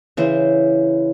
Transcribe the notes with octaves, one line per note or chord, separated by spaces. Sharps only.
C#3 E3 E4 C5